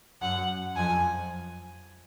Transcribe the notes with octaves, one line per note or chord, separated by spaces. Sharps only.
F#2 F#5
F2 G#5